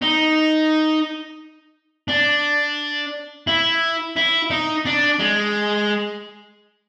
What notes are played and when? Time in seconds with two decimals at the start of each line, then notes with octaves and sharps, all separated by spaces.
0.02 D#4
2.08 D4
3.47 E4
4.16 E4
4.50 D#4
4.86 D4
5.20 G#3